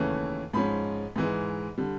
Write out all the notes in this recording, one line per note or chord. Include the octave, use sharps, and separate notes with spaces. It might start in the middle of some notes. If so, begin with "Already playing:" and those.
Already playing: D#2 C#3 E3 A3 C#4
G#2 F3 G#3 C#4 B5
G#2 E3 G#3
D3 G3